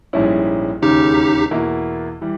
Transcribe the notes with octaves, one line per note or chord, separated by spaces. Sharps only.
A#1 G#2 G3 C#4 E4
E1 D#2 C#3 D#4 G4
E2 B2 A#3 E4
E3 G3